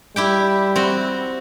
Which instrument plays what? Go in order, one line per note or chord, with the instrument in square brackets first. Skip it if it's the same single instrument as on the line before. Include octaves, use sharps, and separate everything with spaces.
[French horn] G3 [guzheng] E4 G4 G5
[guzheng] C4 F#4